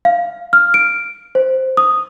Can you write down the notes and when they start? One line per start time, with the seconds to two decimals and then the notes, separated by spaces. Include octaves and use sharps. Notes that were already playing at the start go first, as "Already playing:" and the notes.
0.05 F5
0.53 F6
0.74 D7
1.35 C5
1.77 D#6